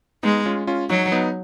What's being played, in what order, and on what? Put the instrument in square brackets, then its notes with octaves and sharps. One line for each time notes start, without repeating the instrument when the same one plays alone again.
[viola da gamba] G#3 [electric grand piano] B3 D#4
[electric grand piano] C#4 F4
C#4 F4
[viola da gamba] F#3 [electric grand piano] D#4 F#4
[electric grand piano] B3 D#4